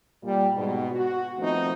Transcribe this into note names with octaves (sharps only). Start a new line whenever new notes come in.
A#2 G3
G#2 B2
F#4
D#3 F3 A3 B3 C4 D#4